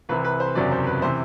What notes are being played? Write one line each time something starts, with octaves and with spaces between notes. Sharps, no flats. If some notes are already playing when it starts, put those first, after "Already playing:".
C2 C3 E3 B4
B4
C5
F#1 E2 C3 F#3 D5
C5
B4
C3 E3 C5